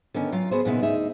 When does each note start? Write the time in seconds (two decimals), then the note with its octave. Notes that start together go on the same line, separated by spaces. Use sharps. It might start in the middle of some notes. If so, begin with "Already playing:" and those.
0.14 D3 D#3 B3 C#4
0.32 F#3 F4 F5 A#5
0.51 B3 F#4 G#4 C5
0.65 A#2 C#3 B3 D#4 E4
0.83 D2 D#4 G#4 E5